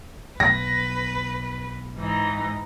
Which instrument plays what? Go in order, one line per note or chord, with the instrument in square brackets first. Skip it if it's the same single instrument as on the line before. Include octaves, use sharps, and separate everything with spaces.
[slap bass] B1 [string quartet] B4 [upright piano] A#6
[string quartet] G#2 E3 D#4